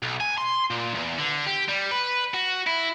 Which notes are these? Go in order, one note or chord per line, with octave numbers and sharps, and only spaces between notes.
B1
G#5
C6
A#2
E2
D3
G4
G3
B4
F#4
E4